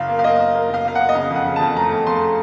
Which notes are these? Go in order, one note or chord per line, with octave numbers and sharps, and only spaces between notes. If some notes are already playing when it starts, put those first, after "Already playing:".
Already playing: F#1 F5
A#3
F5
A#3 D#5
A#3
A#3
F#1 F5
A#3 F5
A#3 F#5
D#5
C#3 F5
F2
F#5
C#3
F2 A5
A3 A#5
F2
A3 C6